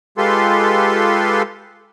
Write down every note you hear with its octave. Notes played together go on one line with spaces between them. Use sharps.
G#3 F4 G4 A4 B4 C6